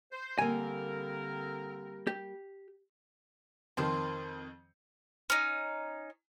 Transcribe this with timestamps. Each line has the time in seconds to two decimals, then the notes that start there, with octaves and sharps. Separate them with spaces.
0.12 C5
0.38 D3 G3 A#3 C4 A#4 G#5
2.07 G4
3.77 F2 D#3 F3 C4 F4
5.30 C#4 D#4